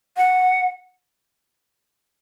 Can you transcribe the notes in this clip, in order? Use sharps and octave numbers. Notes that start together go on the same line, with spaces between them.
F#5